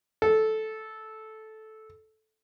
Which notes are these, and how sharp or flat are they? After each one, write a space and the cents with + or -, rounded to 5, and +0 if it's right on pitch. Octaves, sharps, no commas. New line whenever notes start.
A4 -10